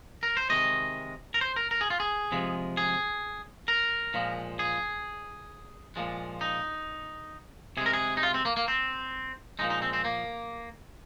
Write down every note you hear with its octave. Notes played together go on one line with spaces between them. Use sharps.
A#4
C5
C3 D#3 G#3 D#5
A#4
C5
A#4
A#4
G#4
F4
G#4
C3 F3 G#3
G#4
A#4
A#2 F3 G#3
G#4
A#2 F3 G#3
D#4
C3 G#3 G#4 A#4
G#4
D#4
F4
C4
A#3
A#3
C4
A#2 F3 G#3 D#4
D#4
C4
C4
A#3